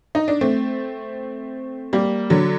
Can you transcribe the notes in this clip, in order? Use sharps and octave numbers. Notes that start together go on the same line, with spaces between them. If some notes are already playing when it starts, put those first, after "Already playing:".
D#4
D4
A3 C4
G3 A#3
D3 F#3